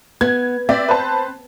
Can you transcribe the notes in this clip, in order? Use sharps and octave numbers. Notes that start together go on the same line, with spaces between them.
B3 G#6
C4 D5 E5
B4 C5 A5